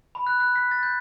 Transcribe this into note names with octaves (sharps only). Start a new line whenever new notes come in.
B5
F#6
F#6
B6
A6
G6